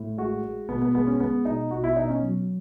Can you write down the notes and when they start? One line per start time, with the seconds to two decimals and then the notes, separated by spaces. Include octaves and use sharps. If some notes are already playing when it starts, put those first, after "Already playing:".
Already playing: A2
0.18 G#3 F#4
0.44 G#3
0.69 B2 B3
0.82 B3
0.95 G#3 B3
1.07 C#4
1.20 G#3 B3
1.45 B2 D#4
1.71 B2 F#4
1.84 E4
1.96 B2 D#4
2.09 C#4
2.22 F#3